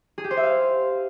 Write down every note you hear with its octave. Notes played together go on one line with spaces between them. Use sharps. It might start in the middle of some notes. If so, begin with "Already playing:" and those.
G#4
G4
C5
E5
F5